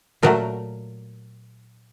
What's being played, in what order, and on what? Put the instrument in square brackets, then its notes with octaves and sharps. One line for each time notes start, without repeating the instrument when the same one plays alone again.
[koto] A#2 F#3 A3 A#4